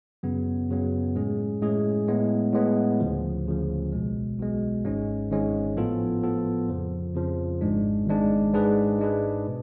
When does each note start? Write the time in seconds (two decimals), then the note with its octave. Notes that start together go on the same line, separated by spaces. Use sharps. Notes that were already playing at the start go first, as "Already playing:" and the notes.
0.23 F#2 C#3 F#3 B3
0.69 F#2 C#3 F#3 B3
1.15 A2 G#3 C#4 G#4
1.62 A2 G#3 C#4 G#4
2.08 A2 G#3 B3
2.53 A2 G#3 B3
3.00 D2 C#3 F3
3.46 D2 C#3 F3
3.93 B1 B2 G#3
4.38 B1 B2 G#3
4.84 G#1 G#2 G#3 C#4
5.31 G#1 G#2 G#3 C#4
5.77 A2 F3 B3 F4 A4
6.23 A2 F3 B3 F4 A4
6.69 F2 C#3 F3
7.15 F2 C#3 F3
7.61 G#1 G#2 G#3 D4
8.07 G#1 G#2 G#3 D4
8.53 G#2 G#3 D4 G#4 B4
8.99 G#2 G#3 D4 G#4 B4
9.47 B2